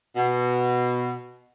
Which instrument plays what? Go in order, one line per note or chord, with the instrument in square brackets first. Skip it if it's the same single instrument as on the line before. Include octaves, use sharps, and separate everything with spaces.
[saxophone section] B2